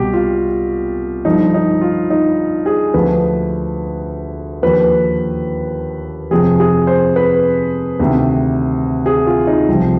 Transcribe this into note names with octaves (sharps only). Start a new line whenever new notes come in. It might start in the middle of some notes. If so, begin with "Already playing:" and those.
Already playing: C2 B2 G4
F4
G2 D3 F3 D#4
D#4
F4
D#4
G#4
D2 D3 F3 B4
D#2 D3 F3 B4
F2 C3 F3 G#4
G#4
C5
B4
D2 C3 D#3
G#4
F4
D#4
C2 C3 F3